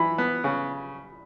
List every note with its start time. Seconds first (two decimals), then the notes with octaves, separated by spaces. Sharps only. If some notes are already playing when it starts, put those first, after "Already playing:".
Already playing: E3 B5
0.18 B3
0.44 C#3